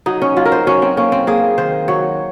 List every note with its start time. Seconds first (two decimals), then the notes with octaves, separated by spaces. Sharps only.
0.06 F#3 D#4
0.22 C#4
0.37 F#3 F4
0.45 A#4
0.52 C5
0.67 F#3 C#4
0.82 C4
0.97 A#3 C#4
1.12 C4
1.27 A#3 G#4
1.58 D#3 C5
1.88 F#3 C#5